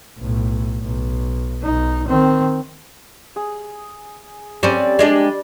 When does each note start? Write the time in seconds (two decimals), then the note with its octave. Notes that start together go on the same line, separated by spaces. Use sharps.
0.18 B1 A2
0.83 B1
1.63 B1 D#4
2.07 D#3 C4
3.36 G#4
4.63 G3 C4 C#4 D5
4.99 G#3 D4 G4